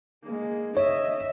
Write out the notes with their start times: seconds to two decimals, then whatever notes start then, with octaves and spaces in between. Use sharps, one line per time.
0.24 G#3 A#3
0.77 C#5 D#5 E5